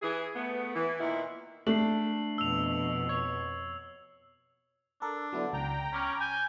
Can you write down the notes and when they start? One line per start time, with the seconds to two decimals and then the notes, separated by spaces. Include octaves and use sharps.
0.02 E3 G#4
0.35 A3 B3
0.75 E3
0.99 A#2 D#3 B3 E4
1.67 A3 D4 C7 F#7
2.38 F2 B2 E6 F7
3.09 C#5
5.02 D4 A4 A#4
5.33 D3 F#3 B3 E4
5.53 C#2 G5 A#5
5.93 C#4 B5 D6 F6
6.20 G#5 G6